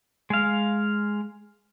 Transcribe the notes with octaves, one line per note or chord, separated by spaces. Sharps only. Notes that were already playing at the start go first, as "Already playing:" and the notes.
G#3 F5